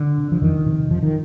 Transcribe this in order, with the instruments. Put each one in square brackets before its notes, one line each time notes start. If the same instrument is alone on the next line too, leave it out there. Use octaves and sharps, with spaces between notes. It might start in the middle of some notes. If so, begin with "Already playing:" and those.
Already playing: [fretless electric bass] D3
C3
F3
F2 D#3
C3
F2 F3
D#3